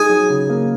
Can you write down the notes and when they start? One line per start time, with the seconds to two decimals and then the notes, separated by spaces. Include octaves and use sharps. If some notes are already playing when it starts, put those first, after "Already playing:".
Already playing: D#4 G#4 G#5
0.09 F#3
0.30 C#3
0.49 A#3